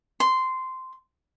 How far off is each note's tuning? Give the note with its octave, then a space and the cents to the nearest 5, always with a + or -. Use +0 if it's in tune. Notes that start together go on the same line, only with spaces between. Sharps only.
C6 -10